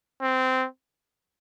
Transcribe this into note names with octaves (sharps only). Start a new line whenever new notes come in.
C4